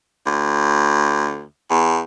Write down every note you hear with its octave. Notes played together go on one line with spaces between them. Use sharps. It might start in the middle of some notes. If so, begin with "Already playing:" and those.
D2
E2